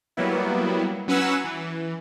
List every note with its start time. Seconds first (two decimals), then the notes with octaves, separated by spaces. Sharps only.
0.17 F#3 G3 A#3 B3 E4
1.08 F#3 C#4 B4 F#5 G#5 E6
1.44 E3